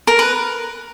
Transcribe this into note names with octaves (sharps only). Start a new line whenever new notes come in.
A#4
B4